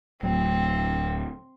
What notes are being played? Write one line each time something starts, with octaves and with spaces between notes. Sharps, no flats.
D1 F#3 C4